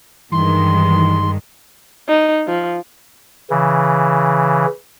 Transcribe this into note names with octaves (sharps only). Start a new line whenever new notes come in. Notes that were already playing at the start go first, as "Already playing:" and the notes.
G2 D#3 E3 G#3 C6
D#4
F3
C#3 E3